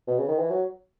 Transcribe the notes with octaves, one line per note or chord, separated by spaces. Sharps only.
B2
C#3
D#3
E3
F#3